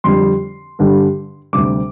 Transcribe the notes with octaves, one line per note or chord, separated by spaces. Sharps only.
F2 D3 G3 C6
G2 D3 G3
D2 C3 G3 D6